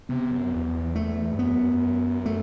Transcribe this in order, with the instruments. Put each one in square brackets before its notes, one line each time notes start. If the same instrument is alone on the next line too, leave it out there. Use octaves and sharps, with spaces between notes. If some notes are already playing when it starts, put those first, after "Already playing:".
[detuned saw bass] C3 [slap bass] B3
[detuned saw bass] F#2
E2
[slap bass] A3
[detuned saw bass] G2
[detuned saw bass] F#2 [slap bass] B3
[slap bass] A3